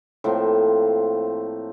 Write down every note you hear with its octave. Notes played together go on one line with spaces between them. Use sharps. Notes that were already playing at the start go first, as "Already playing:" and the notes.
A2 F3 A#3 C4